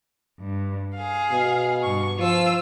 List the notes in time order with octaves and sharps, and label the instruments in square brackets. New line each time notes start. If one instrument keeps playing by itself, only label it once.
[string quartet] G2
G#4 F5
[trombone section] B2
[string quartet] G2 C#6
[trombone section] F3 [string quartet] F4 E6